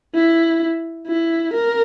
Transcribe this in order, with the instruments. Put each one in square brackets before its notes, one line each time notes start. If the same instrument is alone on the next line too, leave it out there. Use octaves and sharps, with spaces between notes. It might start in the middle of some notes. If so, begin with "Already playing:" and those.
[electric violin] E4
E4
A#4